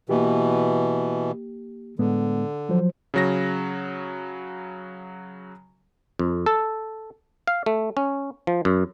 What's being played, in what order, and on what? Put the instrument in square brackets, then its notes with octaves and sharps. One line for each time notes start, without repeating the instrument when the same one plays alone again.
[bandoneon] B2 E3 [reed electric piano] A#3 G4
[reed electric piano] A2 G#3 B3 [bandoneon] D3
[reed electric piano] F3 F#3 C5
[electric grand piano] C#3 F#3 A#6
[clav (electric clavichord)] F2
A4
F5
A3
C#4
F3
F#2